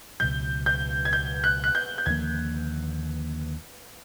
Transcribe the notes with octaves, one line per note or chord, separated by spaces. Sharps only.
C#2 B2 F#3 G6
G6
G#6
G6
F#6
F#6
G6
G6
D#2 D3 F3 A#3 G#6